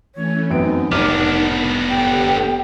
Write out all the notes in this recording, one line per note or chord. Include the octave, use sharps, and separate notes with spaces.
E3 A3 C#4 C#5
F#2 B3 C4 D#4 D7
F1 B3 D4 A#4 D6 F6
G4 A4 G5